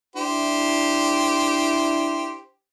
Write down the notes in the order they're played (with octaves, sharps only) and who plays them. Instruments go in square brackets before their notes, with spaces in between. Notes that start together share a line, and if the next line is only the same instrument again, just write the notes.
[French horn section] D4 E4 [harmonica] G4 C5